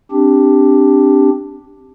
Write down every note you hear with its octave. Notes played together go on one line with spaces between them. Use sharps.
C4 D4 G4